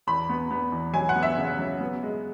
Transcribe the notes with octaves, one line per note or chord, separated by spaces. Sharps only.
E2 B5
B3
B3
E2
F#3 G#5
F#5
B3
E5
C#3
F#3
B3
G#3